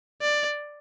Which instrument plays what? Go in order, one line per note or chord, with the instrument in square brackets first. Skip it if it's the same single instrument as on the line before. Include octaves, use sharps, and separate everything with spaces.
[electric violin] D5